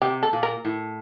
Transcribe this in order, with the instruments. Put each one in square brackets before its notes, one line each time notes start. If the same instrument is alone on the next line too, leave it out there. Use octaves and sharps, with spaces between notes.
[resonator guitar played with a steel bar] C3 [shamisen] G4
[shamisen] A4
[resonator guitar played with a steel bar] A#2
[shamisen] A#4
[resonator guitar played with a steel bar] A2